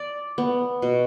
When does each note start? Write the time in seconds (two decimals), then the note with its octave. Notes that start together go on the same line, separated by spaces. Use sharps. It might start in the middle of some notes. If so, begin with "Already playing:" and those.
Already playing: D5
0.38 B3
0.82 B2